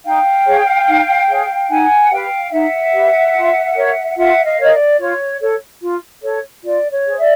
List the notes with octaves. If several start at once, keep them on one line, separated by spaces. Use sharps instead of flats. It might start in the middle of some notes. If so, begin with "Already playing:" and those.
D#4 F5 G5
G#4 C#5
D#4
G#4 C#5
D#4 F#5 G#5
G4 B4 F5 G5
D#4 E5 F#5
G4 B4
F4
A#4 C#5
F4 E5 F#5
D#5 F5
A#4 C#5 D#5
D5
F4 C#5
A4 C#5
F4
A4 C#5
F4 D5
C#5
G#4 C5
D5 E5